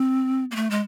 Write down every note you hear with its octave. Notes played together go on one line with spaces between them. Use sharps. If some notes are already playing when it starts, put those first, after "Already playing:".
Already playing: C4
A#3
A3
G#3